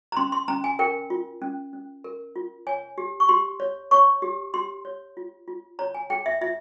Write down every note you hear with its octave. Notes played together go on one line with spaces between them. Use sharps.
A#5
C#4 C6
C6
C#4 A#5
G#5
A#4 G5
F4
C#4
C#4
A#4
F4
C#5 G#5
G4
C#6
G4 C6
C#5
C#5 C#6
G4
G4 C6
C#5
F4
F4
C#5 A#5
G#5
G#4 G5
E5
F4 E5